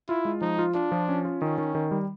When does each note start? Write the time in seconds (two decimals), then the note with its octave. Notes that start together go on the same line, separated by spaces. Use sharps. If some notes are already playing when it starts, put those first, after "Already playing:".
0.09 E4 F4
0.25 G#3
0.41 F3 D#4
0.59 F4
0.75 D4 F4
0.92 F3
1.09 C#4
1.25 F4
1.42 D#3 C#4
1.58 D#3
1.75 D#3
1.91 G3